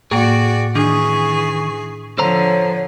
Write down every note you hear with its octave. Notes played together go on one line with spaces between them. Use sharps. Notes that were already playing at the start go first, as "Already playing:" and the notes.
A2 A#3 F#4 G#4 D5 G5
D#3 E3 D4 G#4 C#6
D3 F3 A4 C5 C#5 A#5